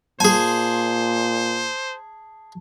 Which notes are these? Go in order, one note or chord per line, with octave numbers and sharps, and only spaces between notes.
A#2 G#4 C5 G#5 A5